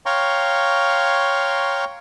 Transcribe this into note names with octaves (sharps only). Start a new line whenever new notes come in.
C#5 F5 G5 A#5 C6 C#6